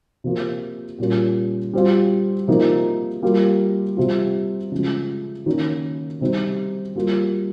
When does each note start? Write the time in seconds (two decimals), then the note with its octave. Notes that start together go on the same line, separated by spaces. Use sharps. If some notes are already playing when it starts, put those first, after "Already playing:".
0.24 C3 F3 A#3 F4
0.99 A#2 G3 A#3 C#4 F4
1.73 G3 C4 F4
2.48 C3 F3 A#3 D#4
3.23 G3 A#3 F4
3.97 C3 G3 C4 F4
4.72 C#3 F3 G#3
5.46 D#3 A#3 C#4
6.21 C3 G3 C4 D#4
6.96 G3 A#3 F4